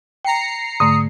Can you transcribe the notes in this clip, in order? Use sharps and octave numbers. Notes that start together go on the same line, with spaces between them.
G5 A#5 C7 C#7
G#2 D3 A3 D#6